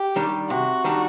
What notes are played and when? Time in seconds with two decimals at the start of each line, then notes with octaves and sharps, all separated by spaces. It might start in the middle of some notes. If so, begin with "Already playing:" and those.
Already playing: G4
0.16 D#3 G3 D4
0.49 C3 F#4
0.84 D#3 G3 D4